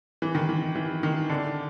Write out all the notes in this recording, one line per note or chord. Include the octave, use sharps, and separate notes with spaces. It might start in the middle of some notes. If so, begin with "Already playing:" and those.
E3
D#3
E3
E3
D#3
D3